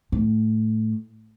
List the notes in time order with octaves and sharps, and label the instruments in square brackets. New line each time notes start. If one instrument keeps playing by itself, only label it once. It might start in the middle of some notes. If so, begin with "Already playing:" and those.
[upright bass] A2